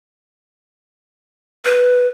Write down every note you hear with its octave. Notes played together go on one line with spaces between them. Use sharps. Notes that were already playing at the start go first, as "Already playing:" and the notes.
B4